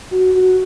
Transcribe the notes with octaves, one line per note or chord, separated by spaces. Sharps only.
F#4
F#4